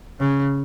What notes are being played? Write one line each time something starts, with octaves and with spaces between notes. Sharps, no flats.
C#3